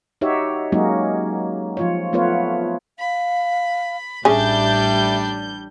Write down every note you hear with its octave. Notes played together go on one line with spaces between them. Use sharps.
D#4 F#4 G4 C#5 E5
F#3 G#3 A#3 C#4 D#4 F#4
F3 F4 C#5
A3 B3 F4 B4 C#5
F5 B5
A1 G3 C#4 D4 G#4 E5 G6